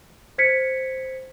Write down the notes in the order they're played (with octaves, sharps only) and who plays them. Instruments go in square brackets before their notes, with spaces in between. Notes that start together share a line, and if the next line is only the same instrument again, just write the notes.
[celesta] C5 G#6 B6 C#7